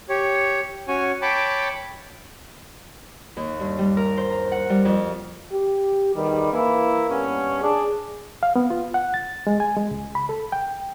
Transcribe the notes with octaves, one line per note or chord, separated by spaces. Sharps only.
G4 C#5
C#4 F#4 C#5 G#5
C#5 G5 A5 B5 D6
D#2
G2
G3
A#4
C5
A#5
F#5
G3
F2
G4
E2 D#3 G3
E3 A#3 E4
G2 B3 C#4
D4 G#4
F5
B3
F4
F#5
A6
G#3
G#5
G#3
C#2
B5
A4
G5